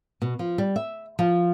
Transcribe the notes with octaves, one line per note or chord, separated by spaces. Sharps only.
B2
F3
G3
E5
F3